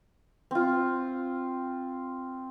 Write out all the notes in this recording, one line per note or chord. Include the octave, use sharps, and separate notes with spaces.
C4 F4